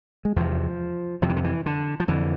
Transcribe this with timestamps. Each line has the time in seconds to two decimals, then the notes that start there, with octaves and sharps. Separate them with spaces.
0.25 G#3
0.36 E2 C3 F3
1.22 F2 C3 F3
1.29 E3
1.36 D3
1.44 E3
1.66 D3
2.00 F3
2.08 F2 D3 E3